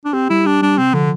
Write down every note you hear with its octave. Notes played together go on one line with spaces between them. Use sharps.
D4
C4 G4
G3 E4
D4 G4
G3 D4
C3 C4
D3 F3